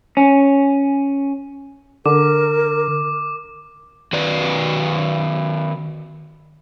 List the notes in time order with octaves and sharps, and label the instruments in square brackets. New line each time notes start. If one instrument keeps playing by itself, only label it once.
[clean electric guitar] C#4
[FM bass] D3 [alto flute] A#4 [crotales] D6
[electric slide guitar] D#3 F#4 B4 D5